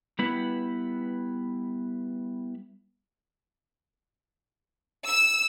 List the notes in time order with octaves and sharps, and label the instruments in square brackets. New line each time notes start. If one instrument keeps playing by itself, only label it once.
[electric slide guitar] G3 B3 E4 B4
[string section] E6